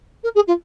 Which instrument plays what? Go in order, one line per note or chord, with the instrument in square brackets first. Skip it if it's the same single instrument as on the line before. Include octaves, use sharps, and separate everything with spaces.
[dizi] A#4
G#4
F4